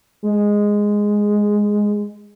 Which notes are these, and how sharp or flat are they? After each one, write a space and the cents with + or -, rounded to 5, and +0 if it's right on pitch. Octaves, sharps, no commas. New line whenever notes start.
G#3 -5